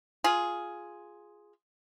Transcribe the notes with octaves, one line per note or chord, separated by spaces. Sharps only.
F4 G#4